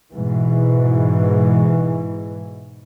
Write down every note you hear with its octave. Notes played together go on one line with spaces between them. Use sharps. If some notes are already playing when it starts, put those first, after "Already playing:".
G#2 B2 E3